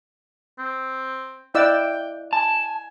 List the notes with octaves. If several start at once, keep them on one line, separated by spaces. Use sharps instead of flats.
C4
E4 D5 D#5 F5 G5 E6 F#6
G#5 A5